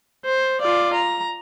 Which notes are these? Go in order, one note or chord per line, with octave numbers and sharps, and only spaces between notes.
C5
F4 D5
A#5